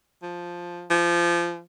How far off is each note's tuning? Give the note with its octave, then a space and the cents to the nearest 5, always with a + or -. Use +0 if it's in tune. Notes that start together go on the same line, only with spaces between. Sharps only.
F3 +0
F3 -25